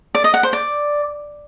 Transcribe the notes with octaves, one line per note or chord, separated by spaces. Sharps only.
D5
D#5
F#5
C5
D5